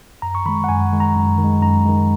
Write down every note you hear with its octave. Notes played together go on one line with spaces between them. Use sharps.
F#2 A#5
C#6
D#3 G#3 B5
F#5
F#2 G#5
D#3 G#3
A#5
F#2
D#3
G#3
F#2 A#5
D#3 G#3